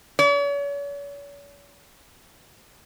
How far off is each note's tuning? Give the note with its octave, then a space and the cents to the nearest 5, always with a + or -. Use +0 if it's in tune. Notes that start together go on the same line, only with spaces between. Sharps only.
C#5 +40